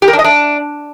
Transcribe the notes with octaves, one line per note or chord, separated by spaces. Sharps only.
G4
A#4
D4
D#5
D4